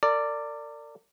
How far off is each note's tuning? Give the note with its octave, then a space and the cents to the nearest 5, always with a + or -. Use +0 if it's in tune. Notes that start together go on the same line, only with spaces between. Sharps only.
A#4 -40 D5 +0